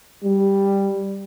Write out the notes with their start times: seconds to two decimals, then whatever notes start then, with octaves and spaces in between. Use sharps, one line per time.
0.23 G3